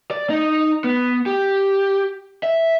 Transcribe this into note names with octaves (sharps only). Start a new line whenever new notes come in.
D5
D#4
B3
G4
E5